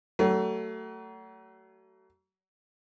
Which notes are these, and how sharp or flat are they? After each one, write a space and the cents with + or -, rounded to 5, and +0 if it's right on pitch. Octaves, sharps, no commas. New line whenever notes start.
F#3 +40 A3 +25